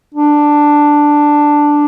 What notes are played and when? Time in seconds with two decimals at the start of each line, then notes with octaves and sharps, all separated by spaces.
0.14 D4